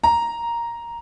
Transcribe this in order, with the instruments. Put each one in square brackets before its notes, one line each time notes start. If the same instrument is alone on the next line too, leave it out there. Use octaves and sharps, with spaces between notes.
[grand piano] A#5